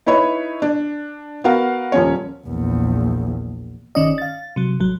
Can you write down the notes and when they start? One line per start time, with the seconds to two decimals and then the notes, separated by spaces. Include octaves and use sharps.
0.06 D#4 E4 B4 C#5 B5
0.62 D4
1.44 B3 F#4 A#4 F5 F#5
1.92 D#1 F3 C#4 C#5
2.47 A#1 E2
3.95 G1 D#3 C#4 D5 D#5
4.18 F5 A6
4.56 C3 F#3
4.80 A1 F#3